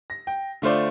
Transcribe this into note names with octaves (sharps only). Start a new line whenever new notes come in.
A#6
G5
D3 A3 F4 C5 D5